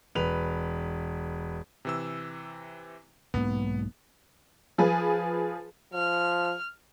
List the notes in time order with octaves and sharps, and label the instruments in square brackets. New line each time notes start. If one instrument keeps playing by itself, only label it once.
[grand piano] E1 B4 F7
[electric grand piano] C3 E3 E6
[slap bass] B1 G#2 A#3 [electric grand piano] B3
[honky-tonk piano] F3 G#4 B4
[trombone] F3 [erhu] F6